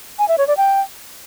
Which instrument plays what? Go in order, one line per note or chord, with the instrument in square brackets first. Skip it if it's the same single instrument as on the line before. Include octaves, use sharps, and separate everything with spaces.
[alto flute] G#5
E5
C#5
D5
G5